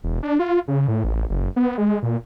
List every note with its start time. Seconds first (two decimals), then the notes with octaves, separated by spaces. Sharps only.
0.04 E1
0.23 D4
0.39 F4
0.68 C#3
0.88 A2
1.04 A1
1.30 F#1
1.56 B3
1.78 G#3
2.03 A#2